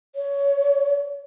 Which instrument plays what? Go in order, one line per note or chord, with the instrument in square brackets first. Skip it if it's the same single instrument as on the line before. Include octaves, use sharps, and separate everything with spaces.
[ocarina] C#5